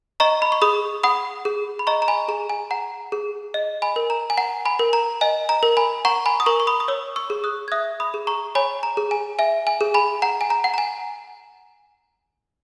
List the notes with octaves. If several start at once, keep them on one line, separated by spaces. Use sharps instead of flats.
D#5 A#5 C#6
B5
C#6
G#4 B5 D#6
F#5 B5 D#6
G#4
B5
D#5 A#5 C#6
A#5
G#5 B5
G#4 A#5
G#5
F#5 A#5
G#4
D#5
G#5 B5
A#4
A#5
G#5
F#5 A#5
G#5 B5
A#4
A#5
D#5 G#5
A#5
A#4
G#5 B5
F#5 A#5 C#6
G#5 B5
D#6
A#4 A#5 C#6
C#6
B5 D#6
D#6
C#5 C#6 E6
C#6 E6
G#4
D#6 F#6
G#6
E5 D#6 F#6
B5 D#6
G#4
A#5 C#6
C#5 G#5 B5
A#5
G#4
G#5
E5 G#5
G#5
G#4
G#5 B5
F#5 A#5
G#5
A#5
F#5
A#5
G#5